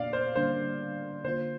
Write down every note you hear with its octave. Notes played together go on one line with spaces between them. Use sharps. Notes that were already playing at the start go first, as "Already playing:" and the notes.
Already playing: A#2 A#3 D4 D5 F5
C5
D3 G3 A#3 D4 C5
D3 A#3 F4 C5